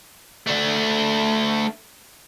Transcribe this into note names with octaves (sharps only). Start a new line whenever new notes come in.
A3 D4